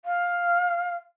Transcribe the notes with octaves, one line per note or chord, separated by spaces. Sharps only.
F5